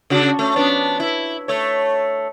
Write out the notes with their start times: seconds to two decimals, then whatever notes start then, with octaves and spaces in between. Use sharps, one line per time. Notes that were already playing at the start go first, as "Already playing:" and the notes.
0.10 C#3 D4 F#4
0.39 A3 C#4
0.56 F3 B3 D4
1.00 E4
1.48 A3 C#5